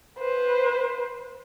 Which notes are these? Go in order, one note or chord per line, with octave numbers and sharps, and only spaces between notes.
B4 C5